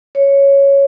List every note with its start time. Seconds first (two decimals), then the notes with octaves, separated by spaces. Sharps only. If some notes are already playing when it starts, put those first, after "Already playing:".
0.15 C#5